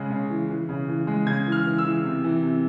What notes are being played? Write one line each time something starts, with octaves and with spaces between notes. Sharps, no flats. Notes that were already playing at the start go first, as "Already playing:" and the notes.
Already playing: C#3 G#3
C#3
E3
E3
C#3
E3
G#3
C#3 G#6
E3
F6
E3
E6
E3
C3
E3
C3